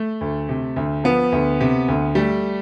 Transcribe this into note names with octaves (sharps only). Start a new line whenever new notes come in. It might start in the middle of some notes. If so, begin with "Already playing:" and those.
Already playing: A3
D2
C3
D2
F3 B3
D2
C3
D2
G3 A3